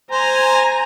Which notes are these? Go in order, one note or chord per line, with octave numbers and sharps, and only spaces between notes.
C5 G#5 A#5